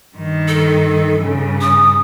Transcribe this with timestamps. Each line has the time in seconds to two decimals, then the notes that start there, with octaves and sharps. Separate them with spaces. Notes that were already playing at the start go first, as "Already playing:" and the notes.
0.16 G2 D#3
0.48 A4
1.17 G2 C#3
1.61 D#6